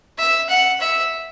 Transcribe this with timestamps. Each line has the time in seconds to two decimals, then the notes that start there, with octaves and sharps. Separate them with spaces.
0.19 E5
0.49 F#5
0.80 E5